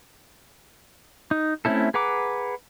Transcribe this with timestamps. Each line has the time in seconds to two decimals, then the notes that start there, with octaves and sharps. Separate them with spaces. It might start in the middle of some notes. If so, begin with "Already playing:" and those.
1.31 D#4
1.65 A3 C4 C#4 E4 A4
1.94 G#4 B4 F#5 A#5 D6